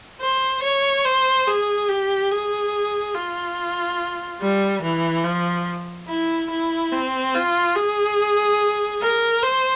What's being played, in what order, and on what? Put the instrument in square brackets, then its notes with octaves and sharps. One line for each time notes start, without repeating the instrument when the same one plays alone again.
[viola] C5
C#5
C5
G#4
G4
G#4
F4
G3
E3
F3
E4
E4
C4
F4
G#4
A#4
C5